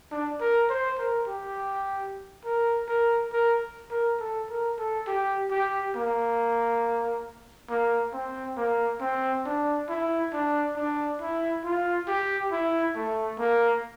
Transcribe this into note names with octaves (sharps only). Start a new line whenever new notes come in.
D4
A#4
C5
A#4
G4
A#4
A#4
A#4
A#4
A4
A#4
A4
G4
G4
A#3
A#3
C4
A#3
C4
D4
E4
D4
D4
E4
F4
G4
E4
A3
A#3